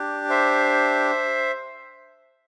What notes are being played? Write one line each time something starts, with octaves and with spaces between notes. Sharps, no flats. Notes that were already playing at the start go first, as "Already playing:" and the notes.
Already playing: D4 G4
C5 E5